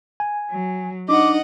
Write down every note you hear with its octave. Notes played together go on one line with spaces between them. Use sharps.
G#5
F#3
D4 D#4 D#5 F#5 D6